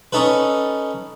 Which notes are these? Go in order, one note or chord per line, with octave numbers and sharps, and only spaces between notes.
C#4 D#4 A4 B4